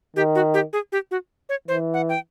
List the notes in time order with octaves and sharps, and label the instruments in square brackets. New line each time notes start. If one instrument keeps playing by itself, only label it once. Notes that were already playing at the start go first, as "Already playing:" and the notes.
[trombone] D#3 [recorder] G4
[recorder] F#4
G4
G#4
G4
F#4
C#5
[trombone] E3 [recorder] C5
[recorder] F#5
G5